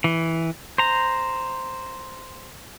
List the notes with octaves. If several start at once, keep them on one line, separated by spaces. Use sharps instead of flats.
E3
C5 A#5